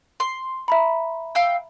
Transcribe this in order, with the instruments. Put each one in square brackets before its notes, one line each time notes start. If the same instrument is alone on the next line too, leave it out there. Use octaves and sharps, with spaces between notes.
[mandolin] C6
[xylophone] E5 A#5 B5
[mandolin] F5 G5 E6